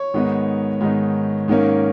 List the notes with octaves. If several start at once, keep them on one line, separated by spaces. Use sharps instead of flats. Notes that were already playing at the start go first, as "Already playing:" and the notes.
Already playing: C#5
G#2 D#3 G#3 B3 D#4
G#2 D#3 G#3 B3 D#4
G#2 D#3 A#3 C#4